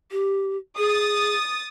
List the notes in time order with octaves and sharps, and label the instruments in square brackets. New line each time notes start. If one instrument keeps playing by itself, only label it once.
[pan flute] G4
[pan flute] G#4 [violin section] D#6 A6